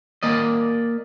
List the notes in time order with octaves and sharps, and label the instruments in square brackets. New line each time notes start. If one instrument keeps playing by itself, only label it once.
[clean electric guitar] A#3 D5 D#5